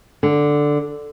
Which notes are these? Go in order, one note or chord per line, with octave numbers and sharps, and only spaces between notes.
D3